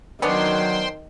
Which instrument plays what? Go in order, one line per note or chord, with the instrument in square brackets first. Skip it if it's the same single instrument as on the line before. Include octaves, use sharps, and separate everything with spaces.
[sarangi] D#3 [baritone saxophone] F#3 [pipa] B3 C#4 D4 [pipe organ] C5 G5 C6